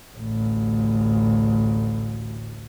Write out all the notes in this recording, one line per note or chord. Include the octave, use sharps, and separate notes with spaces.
A1 D2